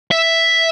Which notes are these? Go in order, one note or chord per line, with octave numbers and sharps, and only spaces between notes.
E5